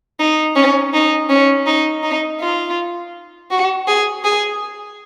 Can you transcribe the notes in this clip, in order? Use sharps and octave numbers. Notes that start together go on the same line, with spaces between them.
D#4
C#4
D#4
C#4
D#4
D#4
F4
F#4
G#4
G#4